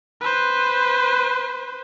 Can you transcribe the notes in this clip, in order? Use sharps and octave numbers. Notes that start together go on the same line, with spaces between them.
B4 C5